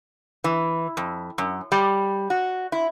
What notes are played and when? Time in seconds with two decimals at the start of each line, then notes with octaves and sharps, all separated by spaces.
0.44 E3
0.97 F2
1.38 F#2
1.72 G3
2.30 F#4
2.72 E4